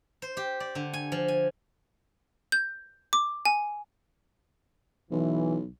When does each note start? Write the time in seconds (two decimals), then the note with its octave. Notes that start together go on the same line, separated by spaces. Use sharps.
0.22 C5
0.37 G4
0.60 D5
0.75 D3
0.93 G#5
1.12 F3
1.28 G#5
2.52 G6
3.13 D6
3.45 G#5
5.11 B1 E3